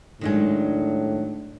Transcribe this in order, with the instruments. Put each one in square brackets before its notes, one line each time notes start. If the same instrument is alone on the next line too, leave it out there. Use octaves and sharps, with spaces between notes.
[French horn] A2 [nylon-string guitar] D#3 F#3 G#3 [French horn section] D4